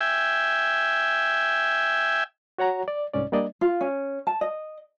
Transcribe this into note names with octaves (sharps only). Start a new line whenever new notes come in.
E5 G5 G#5
F#4 C#5 F#5 A#5
D5
C2 G#2 C#4 D5
G3 A#3 D4 D5 D#5
F4
C#4
A5
D#5